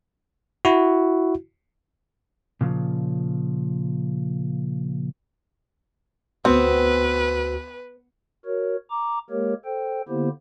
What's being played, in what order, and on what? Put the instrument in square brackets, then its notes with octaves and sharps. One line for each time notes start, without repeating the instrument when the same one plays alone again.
[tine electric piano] E4 F#4
[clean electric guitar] A#2 C#3 F3
[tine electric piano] D2 F#4 [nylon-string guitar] B3 [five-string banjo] C4 [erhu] B4
[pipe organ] F#4 A#4 C#5
A#5 D6
G#3 A#3 G4 A#4 C#5
A4 C5 G5
D3 A#3 B3 E4 G4 C5